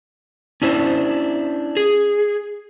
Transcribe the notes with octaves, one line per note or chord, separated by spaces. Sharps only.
C#4 D4 E4 C5
G#4